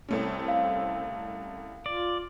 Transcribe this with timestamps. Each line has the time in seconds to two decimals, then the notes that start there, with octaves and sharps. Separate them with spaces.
0.09 C2 A3 C4 C#4
0.48 F5
1.86 F4 D5